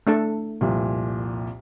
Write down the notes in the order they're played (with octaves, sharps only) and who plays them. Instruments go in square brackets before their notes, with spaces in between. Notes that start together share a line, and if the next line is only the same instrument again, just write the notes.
[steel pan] A3 D4 A4
[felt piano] C2 F2 A#2